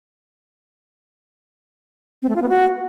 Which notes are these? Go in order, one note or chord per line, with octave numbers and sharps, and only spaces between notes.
C4
A3
F4
B3
F#4